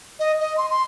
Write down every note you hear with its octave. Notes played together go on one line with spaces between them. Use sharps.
D#5
D#5
C6
C6